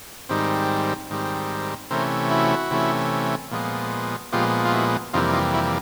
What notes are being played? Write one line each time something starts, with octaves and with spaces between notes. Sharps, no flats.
G#2 D#3 G3 C4
G#2 D#3 G3 C4
C3 E3 A3 C#4 A#4 C5
E4 F#4
C3 E3 A3 C#4
A#2 F3 G#3 B3
A#2 F3 G#3 B3 F4 G4
F4
E4 F#4
F2 C3 E3 G3 A#3 D#4 F4
D#4 F4
E4 F#4